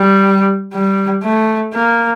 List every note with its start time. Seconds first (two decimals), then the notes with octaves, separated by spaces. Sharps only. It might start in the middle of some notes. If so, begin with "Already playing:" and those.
Already playing: G3
0.73 G3
1.23 A3
1.73 A#3